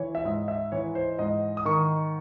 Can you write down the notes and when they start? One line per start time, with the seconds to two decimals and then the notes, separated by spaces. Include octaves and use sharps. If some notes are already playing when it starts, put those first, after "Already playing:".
Already playing: E3 C#5
0.15 E5
0.25 G#2 D#5
0.48 E5
0.72 E3 C#5
0.95 C5
1.19 G#2 D#5
1.57 D#6
1.65 D#3 C#6